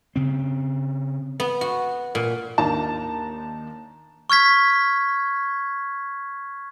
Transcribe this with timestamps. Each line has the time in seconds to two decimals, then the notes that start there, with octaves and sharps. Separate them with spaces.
0.16 C#3 C4
1.40 B3
1.61 F#4
2.15 A#2
2.58 D#2 A#3 D4 D#4 A5 A#5
4.30 C#6 F6 G#6 B6